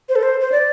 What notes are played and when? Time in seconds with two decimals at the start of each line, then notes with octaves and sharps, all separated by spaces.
0.09 C5
0.16 A4
0.23 C5
0.40 C5
0.52 D5